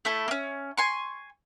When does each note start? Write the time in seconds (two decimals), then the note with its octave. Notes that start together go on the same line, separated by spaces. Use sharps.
0.05 A3 E4 A4
0.28 A#3 C#4
0.77 G#5 C6 C#6